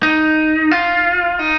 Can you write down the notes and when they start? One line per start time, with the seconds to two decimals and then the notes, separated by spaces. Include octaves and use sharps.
0.03 D#4
0.71 F4
1.39 D#4